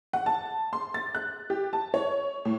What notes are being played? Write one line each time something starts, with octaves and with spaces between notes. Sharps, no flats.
F#5
A5
C6
A6
F#6
G4
A5
C#5
A2